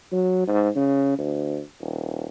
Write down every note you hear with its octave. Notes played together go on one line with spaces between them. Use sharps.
F#3
G#2
C#3
D2
D#1